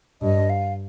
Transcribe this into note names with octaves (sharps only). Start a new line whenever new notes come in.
G2 D#5
F5